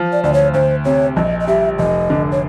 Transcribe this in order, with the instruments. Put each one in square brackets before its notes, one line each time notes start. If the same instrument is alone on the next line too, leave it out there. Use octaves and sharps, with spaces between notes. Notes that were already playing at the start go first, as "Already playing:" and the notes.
Already playing: [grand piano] F3
[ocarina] D5
[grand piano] D2 [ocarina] D5
[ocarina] C#5
[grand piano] D2 [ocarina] C5
[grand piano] C3 [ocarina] C#5
[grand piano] A#1 [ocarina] D#5
[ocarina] D#5
[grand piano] G3 [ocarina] E5
[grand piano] F1 [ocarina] D#5
[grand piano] D3
[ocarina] C#5